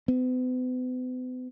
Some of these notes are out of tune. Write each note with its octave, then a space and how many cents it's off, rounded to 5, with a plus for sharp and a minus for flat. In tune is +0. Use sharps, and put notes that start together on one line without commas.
B3 +45